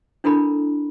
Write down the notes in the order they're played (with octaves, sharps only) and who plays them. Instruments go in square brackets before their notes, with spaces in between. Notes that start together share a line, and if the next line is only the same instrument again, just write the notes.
[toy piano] D4 E4 A4 A#4 B5